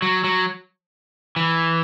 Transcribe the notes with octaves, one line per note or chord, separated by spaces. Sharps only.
F#3
F#3
E3